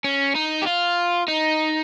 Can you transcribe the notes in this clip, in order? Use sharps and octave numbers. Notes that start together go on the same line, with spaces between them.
C#4
D#4
G4
F4
D#4